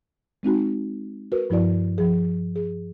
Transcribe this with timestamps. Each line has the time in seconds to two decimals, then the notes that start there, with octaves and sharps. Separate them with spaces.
0.43 G#3 C4 D#4 F#4
1.32 F#4 A#4 B4
1.50 G2 F3 E4 F#4 D5
1.98 F3 G#4
2.56 G#4